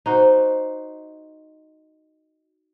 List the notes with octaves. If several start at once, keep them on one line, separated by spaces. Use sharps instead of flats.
D#4 F#4 C5